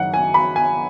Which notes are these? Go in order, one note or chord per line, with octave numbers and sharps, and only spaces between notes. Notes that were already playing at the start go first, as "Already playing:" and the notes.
Already playing: F#1 F#2 D#3 F#5
G#5
B5
G#5